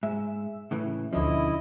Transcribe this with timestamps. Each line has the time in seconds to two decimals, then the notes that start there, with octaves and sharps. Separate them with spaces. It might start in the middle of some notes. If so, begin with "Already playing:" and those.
0.03 G#2 E5
0.71 A2 C#3 E3
1.13 D2 B2 D3 F3 C#4 E4 D#5